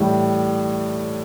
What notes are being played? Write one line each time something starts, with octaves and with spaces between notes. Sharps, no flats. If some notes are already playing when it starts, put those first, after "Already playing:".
Already playing: A2 E3 G3